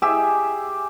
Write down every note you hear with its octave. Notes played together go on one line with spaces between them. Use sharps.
G4 G#4 E5